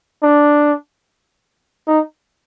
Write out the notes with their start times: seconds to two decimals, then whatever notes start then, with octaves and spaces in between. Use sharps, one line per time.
0.23 D4
1.87 D#4